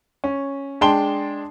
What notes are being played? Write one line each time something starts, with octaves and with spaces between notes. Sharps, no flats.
C#4
G#3 D4 G5 A5 C6 G7